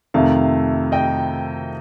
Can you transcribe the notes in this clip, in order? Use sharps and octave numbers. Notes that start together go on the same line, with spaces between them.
F2 C3 D#3 A3 F5
D#5 G5